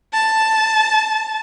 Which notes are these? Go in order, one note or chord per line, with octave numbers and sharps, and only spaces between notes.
A5